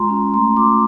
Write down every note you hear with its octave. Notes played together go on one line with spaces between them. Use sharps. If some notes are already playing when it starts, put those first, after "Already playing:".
Already playing: G#3 F4 A#5 C6
C#4
A3 A#5 C6
F4 C6 D6